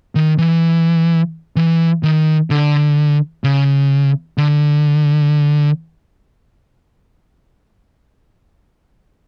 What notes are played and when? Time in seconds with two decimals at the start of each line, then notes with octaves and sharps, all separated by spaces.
0.15 D#3
0.38 E3
1.56 E3
2.03 D#3
2.50 D3
3.44 C#3
4.38 D3